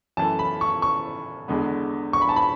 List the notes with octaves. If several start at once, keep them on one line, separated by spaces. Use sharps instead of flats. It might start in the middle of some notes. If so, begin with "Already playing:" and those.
F#2 E3 A3 A5
B5
C#6
C#6
E2 D3 G#3 B3
C#6
B5
A5
B5